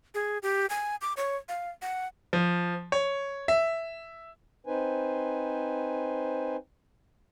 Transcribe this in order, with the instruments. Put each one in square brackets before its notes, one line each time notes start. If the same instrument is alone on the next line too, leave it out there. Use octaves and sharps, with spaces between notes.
[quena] G#4
G4
G#5
D6
C#5
F5
F#5
[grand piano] F3
C#5
E5
[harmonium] C4 D#4 B4 C5 G#5